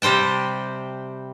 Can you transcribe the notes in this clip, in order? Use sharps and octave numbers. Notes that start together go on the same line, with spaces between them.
C3 G3 C5 G5 A5